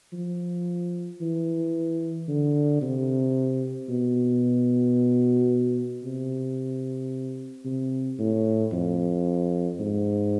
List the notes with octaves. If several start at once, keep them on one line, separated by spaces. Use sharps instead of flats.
F3
E3
D3
C3
B2
C3
C3
A2
F2
G#2